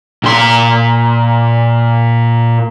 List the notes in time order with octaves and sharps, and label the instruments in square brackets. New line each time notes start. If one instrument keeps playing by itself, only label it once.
[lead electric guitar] A#2 C6